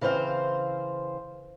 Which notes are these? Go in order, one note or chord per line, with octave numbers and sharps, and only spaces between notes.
C#3 E3 C4 C5 F5